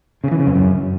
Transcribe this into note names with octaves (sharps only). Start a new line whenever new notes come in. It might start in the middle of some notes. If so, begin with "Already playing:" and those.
C#3
E3
C#3
F2
F#2